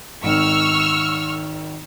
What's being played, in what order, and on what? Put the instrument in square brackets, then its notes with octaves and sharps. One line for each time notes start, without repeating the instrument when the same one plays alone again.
[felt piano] G#1 D#3 [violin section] C#6 E6 F6